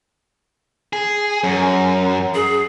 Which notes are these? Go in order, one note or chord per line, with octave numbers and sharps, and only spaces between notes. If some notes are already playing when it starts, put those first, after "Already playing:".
G#4
F#2
G#4